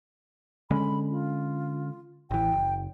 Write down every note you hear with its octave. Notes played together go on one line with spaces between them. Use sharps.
D3 G#3 C#4 B5
F4
A1 E3 G5
F#1